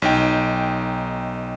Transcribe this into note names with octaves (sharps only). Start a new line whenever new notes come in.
B1 D#4 G5